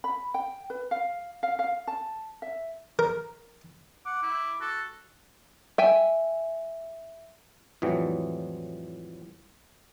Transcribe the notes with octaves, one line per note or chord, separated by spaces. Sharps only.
B5
G5
B4
F5
F5
F5
A5
E5
A#4
F#5 D6
E4
F#4 A4
E5 G5 G#5
F2 A2 E3 F#3 G3